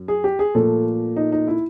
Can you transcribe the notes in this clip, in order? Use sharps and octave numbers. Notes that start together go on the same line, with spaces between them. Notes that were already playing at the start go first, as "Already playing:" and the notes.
Already playing: F#2
G#4
G4
G#4
A#2 F3 A3 A4
D#4
D#4
E4